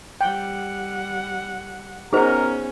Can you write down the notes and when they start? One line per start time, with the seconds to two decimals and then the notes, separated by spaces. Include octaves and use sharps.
0.21 G3 F#5 G5
2.13 B3 C#4 D#4 F#4 G#4 A#4 C5